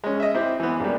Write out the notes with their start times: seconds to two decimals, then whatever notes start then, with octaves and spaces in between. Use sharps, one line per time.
0.04 G#3 C#4
0.20 D#5 E5
0.35 C4 E4 G4 C5
0.60 E3 B3
0.80 A#1 A#2 C#3 G3